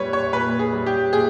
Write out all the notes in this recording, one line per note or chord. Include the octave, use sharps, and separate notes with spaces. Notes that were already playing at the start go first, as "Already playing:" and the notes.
Already playing: A#2 G3 B4 C#5
C#5
A#2 B4
G#4
G3
G4
A#2 G#4